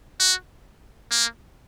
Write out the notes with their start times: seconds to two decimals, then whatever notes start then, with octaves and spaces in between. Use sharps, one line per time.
0.20 F#4
1.11 A#3